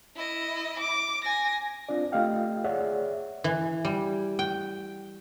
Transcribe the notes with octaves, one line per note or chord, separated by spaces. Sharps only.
E4 D#5
D6
G#5 A#6
C4 D4 F4 D5
A3 F4 G4 D#5 F5 G5
G#4 C#5 D5 E5 F#5
E3
G3
G5